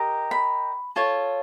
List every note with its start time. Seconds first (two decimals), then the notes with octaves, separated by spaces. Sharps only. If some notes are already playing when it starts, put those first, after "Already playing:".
Already playing: G4 A#4 D#5
0.31 B5
0.96 F4 A4 C#5